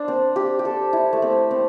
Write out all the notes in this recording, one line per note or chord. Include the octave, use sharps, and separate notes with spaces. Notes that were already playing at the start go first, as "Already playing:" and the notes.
Already playing: D4 C5
C4
G4
G4
A4
E4
A3
C4
C4